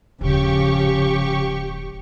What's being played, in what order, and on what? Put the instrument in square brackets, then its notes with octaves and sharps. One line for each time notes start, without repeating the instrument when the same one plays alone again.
[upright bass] D#1 G#2 [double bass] C#3 F3 [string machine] G4 C#6